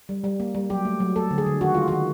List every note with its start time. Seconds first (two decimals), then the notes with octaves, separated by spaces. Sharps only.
0.09 G3
0.24 G3
0.40 A#3
0.55 G3
0.70 F#3 G4
0.85 A3
1.00 F#3
1.16 A3 A4
1.31 D3
1.38 G#4
1.46 D3
1.61 D#3 F#4
1.74 G#3 F4
1.88 D#3 F#4